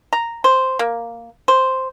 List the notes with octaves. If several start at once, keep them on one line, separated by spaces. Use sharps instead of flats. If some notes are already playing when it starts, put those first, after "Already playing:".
A#5
C5
A#3
C5